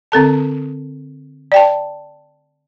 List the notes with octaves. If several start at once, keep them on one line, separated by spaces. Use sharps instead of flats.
D3 C4 A4 A5
D5 G5 A5